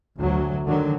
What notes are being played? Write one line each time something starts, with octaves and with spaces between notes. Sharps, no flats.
D2 F#3
D3 D#3 F#3